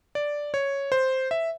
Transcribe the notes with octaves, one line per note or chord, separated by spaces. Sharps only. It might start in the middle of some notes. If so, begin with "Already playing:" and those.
D5
C#5
C5
E5